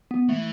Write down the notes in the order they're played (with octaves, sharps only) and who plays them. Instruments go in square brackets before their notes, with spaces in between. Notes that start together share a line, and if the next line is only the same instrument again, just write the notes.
[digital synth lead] B3
[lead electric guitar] E3 [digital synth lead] A3